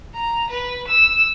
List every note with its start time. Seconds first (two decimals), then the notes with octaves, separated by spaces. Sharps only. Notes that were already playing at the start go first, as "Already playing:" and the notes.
0.14 A#5
0.50 B4
0.87 E6